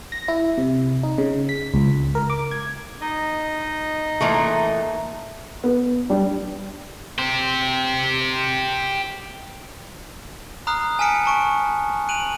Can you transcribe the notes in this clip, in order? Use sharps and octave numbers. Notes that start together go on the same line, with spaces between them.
A#6
E4
C3
D#4
C#3
B6
C#2
A#4
D6
G#6
D#4 D#5
A#2 E3 A3
B3
G3 D4
G4 C5
A#5 B5 D#6 F6 F#6 C7
G#5 A5 F6 B6 C#7 D7
A5 C#6 D7
F#6 D7 D#7 F7 F#7